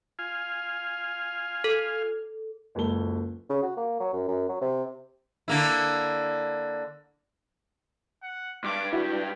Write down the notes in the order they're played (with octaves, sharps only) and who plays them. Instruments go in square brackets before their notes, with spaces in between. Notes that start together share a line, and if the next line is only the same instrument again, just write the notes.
[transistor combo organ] F4 F5 G#5
[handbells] A4
[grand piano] F#1 C#2 A#3 A4 G7
[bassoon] C#3
F#4
A#3
F#3
F#2
F#2
F#3
C3
[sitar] D3 A#3 E4
[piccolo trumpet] F#5
[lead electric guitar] G2 [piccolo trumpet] D6
[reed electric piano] E4 F#4 [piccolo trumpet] G4